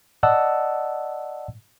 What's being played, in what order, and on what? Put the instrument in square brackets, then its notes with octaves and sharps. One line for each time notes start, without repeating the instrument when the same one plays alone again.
[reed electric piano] D5 D#5 F#5 A5 E6